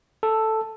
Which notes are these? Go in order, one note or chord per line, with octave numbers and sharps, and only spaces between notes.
A4